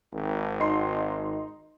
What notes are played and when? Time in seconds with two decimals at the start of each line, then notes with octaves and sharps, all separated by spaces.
0.13 G#1
0.60 D#4 C6